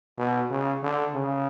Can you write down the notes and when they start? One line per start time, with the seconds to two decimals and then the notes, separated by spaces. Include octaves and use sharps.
0.19 B2
0.51 C#3
0.83 D3
1.15 C#3